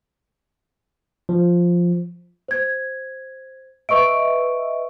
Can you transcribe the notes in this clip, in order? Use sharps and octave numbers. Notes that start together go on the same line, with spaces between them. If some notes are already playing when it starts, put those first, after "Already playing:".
F3
C5 G#6
B4 D#5 E5 C#6 D7